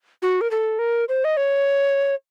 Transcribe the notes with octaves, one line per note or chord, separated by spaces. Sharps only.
F#4
A#4
A4
A#4
C5
D#5
C#5